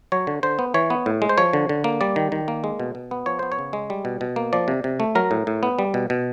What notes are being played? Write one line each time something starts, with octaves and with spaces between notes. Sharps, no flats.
F#3 C#5
D3
D3 C5
B3
E3 C#5
B3
A2
G#3
C5
F3 C#5
D3
D3
A#3
G3 D5
D#3
D#3
A#3
G#3
B2
B2
B3
F3 C#5
B3 C5
C#5
C#3
G#3
G3
B2
B2
A#3
F3 D5
C3
C3
A3
F#3 A#4
A2
A2
B3
G3
B2
B2